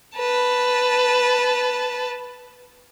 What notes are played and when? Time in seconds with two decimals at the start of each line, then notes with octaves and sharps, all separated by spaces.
0.17 B4 A5